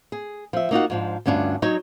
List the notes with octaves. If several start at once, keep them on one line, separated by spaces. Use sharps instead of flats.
G#4
F3 E5
A#3 D#4 F4 F#4
G#2 F3 D4
D2 G2 C#4 D4 F4
F#3 D#4 C#5